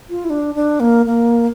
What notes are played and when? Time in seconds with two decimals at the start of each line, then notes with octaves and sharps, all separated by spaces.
0.10 F4
0.25 E4
0.30 D4
0.55 D4
0.80 A#3
1.06 A#3